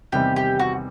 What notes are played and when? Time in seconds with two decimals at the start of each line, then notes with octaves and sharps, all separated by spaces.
0.12 E2 C3 D#3 G3 C4 G4
0.36 G4
0.59 F#4